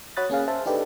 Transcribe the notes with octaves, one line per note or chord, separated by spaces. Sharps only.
F#4 C#5 B5 D#6 F#6 A6
A#3 C#4 G#4 F5
C5 E5 A5
D4 D#4 G4 A4 B4